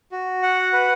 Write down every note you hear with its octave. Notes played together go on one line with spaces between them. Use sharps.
F#4
F#5
B4